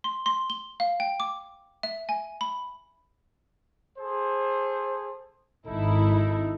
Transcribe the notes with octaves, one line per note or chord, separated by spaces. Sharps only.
C6
C6
G7
F5
G5
D6
E5
G#5
B5
G#4 A4 C5
G#1 D#4 E4 A4